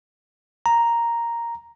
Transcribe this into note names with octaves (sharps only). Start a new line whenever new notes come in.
A#5